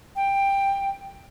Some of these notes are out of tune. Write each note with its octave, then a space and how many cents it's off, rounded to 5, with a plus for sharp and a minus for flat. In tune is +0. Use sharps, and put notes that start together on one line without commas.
G5 +10